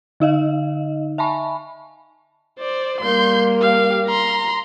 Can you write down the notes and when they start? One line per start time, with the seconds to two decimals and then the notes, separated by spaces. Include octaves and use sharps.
0.20 D3 D#4 D#5 F5
1.18 E5 G#5 A5 B5 C#6
2.59 C5 D5
3.01 G3 A#3 C6 G6
3.61 G4 F5
4.07 A#5 C6